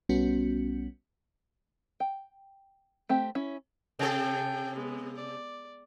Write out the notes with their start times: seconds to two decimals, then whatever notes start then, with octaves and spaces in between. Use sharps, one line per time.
0.09 B1 G3 B3 C#4 F#4
2.00 G5
3.09 A3 C4 G4
3.35 C#4 E4
3.99 C3 A4 G5 G#5
4.75 G#3 B3
5.16 D5